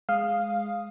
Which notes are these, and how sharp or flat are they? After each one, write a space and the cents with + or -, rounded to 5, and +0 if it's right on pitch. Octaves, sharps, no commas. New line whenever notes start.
G#3 +0 F5 +0 D#6 +0